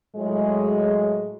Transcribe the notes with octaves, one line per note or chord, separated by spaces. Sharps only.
A2 F#3 G#3